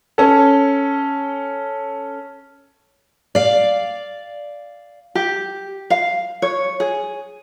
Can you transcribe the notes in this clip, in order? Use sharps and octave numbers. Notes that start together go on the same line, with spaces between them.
C#4 A4
D5 F5
G4
F5
C#5
G#4